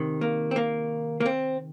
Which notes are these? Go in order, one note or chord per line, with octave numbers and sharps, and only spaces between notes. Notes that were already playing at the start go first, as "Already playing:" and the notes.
Already playing: C3 D#3
A#3
C4
A#3
A#3
C4